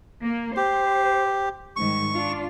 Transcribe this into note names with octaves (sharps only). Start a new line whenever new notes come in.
A#3
G4 C5
G#2 D#3 G3 C#6
D4 F4